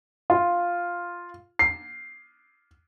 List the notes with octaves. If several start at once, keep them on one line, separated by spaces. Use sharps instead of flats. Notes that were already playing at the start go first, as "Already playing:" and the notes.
F4
C7